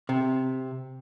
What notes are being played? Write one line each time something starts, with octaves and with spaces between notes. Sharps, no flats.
C3